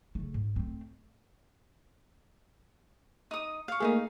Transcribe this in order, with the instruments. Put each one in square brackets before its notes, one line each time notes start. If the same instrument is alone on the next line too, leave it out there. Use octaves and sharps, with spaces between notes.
[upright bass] C#3 A3
G#2
A3 C4
[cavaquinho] D#4 D#6
F5 C#6
[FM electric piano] A3 A#3 G#4 [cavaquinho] D#4 E4 F5